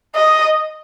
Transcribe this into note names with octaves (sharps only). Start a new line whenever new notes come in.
D#5